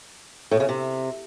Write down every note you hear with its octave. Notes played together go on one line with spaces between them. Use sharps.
A2
C#3
C3